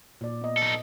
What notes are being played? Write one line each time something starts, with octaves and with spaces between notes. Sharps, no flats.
A#2 D5
B3 D#5
D#4 A4